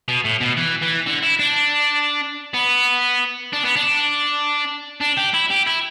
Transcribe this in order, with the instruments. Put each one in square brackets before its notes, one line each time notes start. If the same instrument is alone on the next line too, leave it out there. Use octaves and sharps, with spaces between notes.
[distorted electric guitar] B2
A2
B2
E3
E3
D3
E4
D4
B3
D4
B3
D4
D4
G4
E4
G4
E4